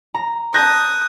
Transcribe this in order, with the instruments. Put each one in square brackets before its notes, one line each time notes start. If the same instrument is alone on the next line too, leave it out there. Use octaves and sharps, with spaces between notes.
[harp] A#5
[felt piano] A5 G6 A#6 [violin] D#6 [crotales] F#6